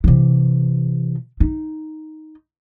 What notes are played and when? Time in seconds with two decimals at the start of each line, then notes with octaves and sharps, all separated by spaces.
0.04 C3 E3
1.40 D#4